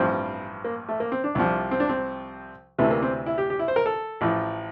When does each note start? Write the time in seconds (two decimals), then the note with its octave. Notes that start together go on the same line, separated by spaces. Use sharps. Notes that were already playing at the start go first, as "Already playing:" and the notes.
Already playing: A1 G2 F3 C4
0.64 A#3
0.89 A3
1.00 A#3
1.12 C4
1.24 D4
1.35 C2 C3 F3
1.71 C4
1.80 D4
1.89 C4
2.78 D2 C3 E3 A3
2.90 A#3
3.02 C4
3.26 E4
3.38 G4
3.50 G4
3.59 E4
3.68 C5
3.76 A#4
3.86 A4
4.21 A1 A2 F3